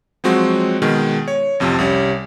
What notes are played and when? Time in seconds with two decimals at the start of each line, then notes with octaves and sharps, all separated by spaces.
0.24 F3 F#3 G#3 C4 F#4
0.82 B2 D#3 G#3
1.28 C#5
1.60 A1 F2 C3 F3
1.79 C2 G3 C#4